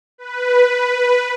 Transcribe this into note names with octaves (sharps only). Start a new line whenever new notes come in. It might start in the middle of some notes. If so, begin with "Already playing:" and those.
B4